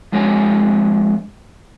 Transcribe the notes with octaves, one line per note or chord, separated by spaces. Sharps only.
F2 G#3 D4 F#4 C#5 G#5